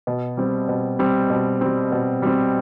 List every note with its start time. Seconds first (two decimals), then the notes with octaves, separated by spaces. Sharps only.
0.07 B2
0.37 G3 C4
0.68 B2
0.99 G3 C4
1.30 B2
1.61 G3 C4
1.92 B2
2.22 G3 C4